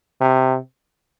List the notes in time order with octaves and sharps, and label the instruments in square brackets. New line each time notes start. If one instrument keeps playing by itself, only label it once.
[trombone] C3